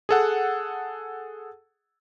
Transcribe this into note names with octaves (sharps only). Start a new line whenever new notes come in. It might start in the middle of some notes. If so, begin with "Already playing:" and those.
G#4 A4 F#5